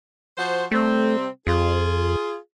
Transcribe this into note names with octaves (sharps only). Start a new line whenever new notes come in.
F3 F#4 C5
C3 G3 A3 C4
F2 F4 G#4